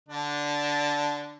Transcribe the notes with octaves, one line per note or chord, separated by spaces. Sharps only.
D3 D4